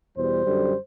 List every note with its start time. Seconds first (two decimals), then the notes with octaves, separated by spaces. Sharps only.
0.17 E2 B2 G3 C5
0.45 F#2 D3 G3